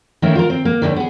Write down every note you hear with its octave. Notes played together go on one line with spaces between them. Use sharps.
D#3 E3 A3 A#3 C#4 E4
F4 A#4
C4
A#3
D#2 B2 D3 D#3
B3 G#4